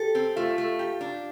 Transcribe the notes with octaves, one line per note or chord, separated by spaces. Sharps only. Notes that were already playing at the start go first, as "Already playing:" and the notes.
Already playing: G4 A4
C4
A3 F4
A3
G4
D4